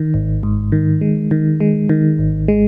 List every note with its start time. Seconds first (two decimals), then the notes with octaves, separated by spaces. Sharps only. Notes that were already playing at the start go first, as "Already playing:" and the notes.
Already playing: D#3
0.14 G#1
0.43 G#2
0.72 D#3
1.01 G#3
1.31 D#3
1.60 G#3
1.89 D#3
2.19 G#1
2.48 G#3